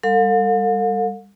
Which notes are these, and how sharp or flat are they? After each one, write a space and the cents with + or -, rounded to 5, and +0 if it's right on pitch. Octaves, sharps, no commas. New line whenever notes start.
G3 +30 A4 +40 F5 +45